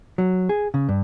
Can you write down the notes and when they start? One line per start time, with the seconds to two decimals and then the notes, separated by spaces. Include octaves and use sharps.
0.18 F#3
0.49 G#4
0.74 C#3
0.89 G2